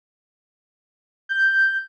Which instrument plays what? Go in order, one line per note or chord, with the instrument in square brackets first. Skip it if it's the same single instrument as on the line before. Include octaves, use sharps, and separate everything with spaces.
[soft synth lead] G6